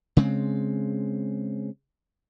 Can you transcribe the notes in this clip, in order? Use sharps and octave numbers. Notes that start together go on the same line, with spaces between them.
C#3 G#3 C4